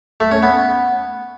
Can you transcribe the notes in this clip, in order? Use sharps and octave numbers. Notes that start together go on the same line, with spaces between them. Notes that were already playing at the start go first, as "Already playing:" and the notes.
A3
C#4
B3